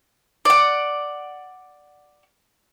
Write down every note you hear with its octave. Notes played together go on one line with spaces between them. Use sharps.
D5 F#5